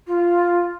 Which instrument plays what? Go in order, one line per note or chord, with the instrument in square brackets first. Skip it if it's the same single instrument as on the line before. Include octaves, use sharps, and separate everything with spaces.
[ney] F4